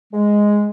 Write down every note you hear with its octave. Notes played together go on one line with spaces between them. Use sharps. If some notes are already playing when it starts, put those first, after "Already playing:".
G#3